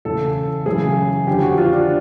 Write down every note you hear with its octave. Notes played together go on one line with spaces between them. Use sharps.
E2 C#3 E3 A4
F#2 C#3 E3 G#4
F2 D3 G4
F#4
F4
D4